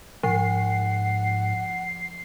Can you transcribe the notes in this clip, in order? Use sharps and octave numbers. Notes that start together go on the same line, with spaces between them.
G#2 F3 F#5 C7